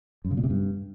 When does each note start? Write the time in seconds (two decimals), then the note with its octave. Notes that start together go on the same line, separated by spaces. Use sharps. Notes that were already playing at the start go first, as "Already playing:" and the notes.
0.25 F#2
0.31 C#3
0.37 A#2
0.44 C3
0.50 G2